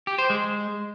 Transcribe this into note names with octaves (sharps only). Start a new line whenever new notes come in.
G4
C5
G#3